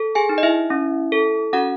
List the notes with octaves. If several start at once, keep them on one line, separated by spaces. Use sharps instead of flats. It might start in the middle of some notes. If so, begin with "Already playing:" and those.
Already playing: A4
G#4 G#5
D#4
D#5
E4 E5
C#4
A4
C#4 F#4 F#5